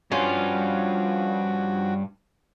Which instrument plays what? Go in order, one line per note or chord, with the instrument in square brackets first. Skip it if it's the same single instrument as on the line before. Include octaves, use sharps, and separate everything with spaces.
[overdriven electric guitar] G2 [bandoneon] F3 F#4 [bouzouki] C#4 F4